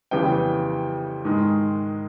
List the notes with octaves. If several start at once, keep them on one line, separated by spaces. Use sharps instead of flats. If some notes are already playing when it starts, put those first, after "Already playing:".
F2 C#3 E3 G3 B3 G5
G#2 D#3 G#3